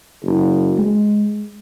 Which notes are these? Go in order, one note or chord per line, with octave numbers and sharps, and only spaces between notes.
F#1
G#3